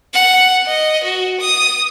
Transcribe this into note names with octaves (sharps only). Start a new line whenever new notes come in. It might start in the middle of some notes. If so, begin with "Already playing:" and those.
F#5
D#5
F#4
D#6